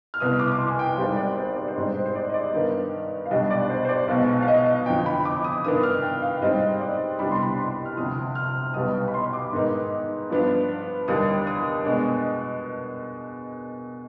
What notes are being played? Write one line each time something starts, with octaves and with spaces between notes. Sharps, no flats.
F6
C2 B2 B3 D#6
D6
D6
C6
G#5
G5
G#1 G#2 G3 C5
D5
C5
D5
C5
G#2 G3 C4 D#4 D5
C5
C5
D5
D#5
D5
G2 D#3 B3 D#4
F5
B1 B2 G3 D4 D#5
D5
C5
C5
D5
B1 B2 G#3 F5
F5
D#5
F2 D3 F3 G5
B5
D6
D#6
G2 D#3 B3 D4 D#6
F6
G5
F5
G#2 G3 C4 D#5
D5
C2 B2 G3 D4 B5
C6
B5
C6
F6
D2 C3 F3 D#6
F6
B1 B2 G3 B3 D#6
B5
C6
D6
G#2 D#3 B3 D#4
G2 F3 B3 D4
D#2 D3 G3 D4 D#6
D#6
B2 G#3 D4